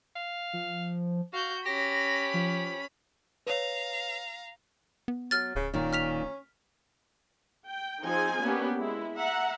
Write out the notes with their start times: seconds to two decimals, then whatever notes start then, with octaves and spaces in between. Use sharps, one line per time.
0.16 F5
0.53 F3
1.33 F#4 F5 G6
1.66 C#4 G4 B5 A#6
2.34 F3
3.47 B4 C#5 F5 A#5
5.08 B3
5.31 F#3 F6 A6
5.55 D1 C#3
5.74 A#2 D#3 C#4
5.93 F6 B6 F7
7.66 G5
8.03 F3 C4 D#4 F4 G#4 G#5
8.41 A#3 B3 C#4 D4 G4
8.80 G#3 E4
9.16 E5 F#5 A#5